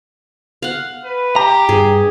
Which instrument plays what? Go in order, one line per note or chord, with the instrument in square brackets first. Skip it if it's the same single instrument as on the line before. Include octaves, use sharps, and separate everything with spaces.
[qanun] F5 F#5
[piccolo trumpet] B4
[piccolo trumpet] G4 [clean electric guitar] A#5
[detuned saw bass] G2 [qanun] G#4